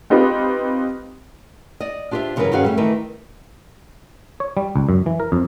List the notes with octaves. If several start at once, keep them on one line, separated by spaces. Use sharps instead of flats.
C4 D#4 F4 G4 B4
D5 D#5
D4 F4 G4 B4 C5 E5
G2 C#3 E3 F#3 A#4 B4
G2 D#3 C#4 F#4 G#4 F5
G3 A3 C#4
D#3 E3 A3 A#4 B4
C#5
G3
C#2
F#2
E3
A#4
F2